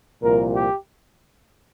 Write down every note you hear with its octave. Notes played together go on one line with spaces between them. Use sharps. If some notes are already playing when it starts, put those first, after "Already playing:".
C2 A#2 F3 A#4
G4